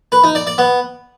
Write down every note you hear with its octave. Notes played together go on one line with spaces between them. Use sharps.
B4
D#4
D5
D5
B3